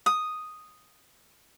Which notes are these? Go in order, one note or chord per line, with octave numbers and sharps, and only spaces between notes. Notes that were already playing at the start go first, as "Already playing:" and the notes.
D#6